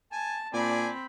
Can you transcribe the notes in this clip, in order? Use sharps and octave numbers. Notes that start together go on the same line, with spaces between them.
G#5 A5
A#2 C4 D4 D5 G#5 B5